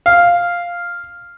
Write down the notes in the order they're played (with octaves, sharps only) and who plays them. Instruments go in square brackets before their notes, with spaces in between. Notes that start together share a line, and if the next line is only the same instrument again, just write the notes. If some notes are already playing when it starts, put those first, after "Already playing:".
[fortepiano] F5